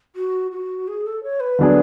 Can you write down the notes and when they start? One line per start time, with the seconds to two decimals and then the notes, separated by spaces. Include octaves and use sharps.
0.16 F#4
0.51 F#4
0.88 G#4
1.05 A4
1.23 C#5
1.40 B4
1.59 D3 F#3 B3 D4 G#4